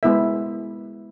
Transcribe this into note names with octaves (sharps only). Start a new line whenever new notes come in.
G#3 B3 E4 A#4 E5